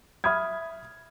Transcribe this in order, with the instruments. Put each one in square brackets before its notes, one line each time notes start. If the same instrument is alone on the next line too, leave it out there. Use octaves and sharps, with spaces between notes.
[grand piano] E5 B5 D#6 F6 G#6